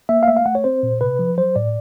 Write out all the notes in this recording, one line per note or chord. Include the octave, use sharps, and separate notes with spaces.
A#3 E5
F5
A3 E5
F5
A3 F#5
C#5
C4 C5
A#2
C3 B4
F3
F#3 C5
A2 D5